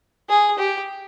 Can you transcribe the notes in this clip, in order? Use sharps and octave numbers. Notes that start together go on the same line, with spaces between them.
G#4
G4